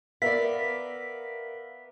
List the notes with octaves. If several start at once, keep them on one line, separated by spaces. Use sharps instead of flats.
B3 A#4 D5 E5 F5 B6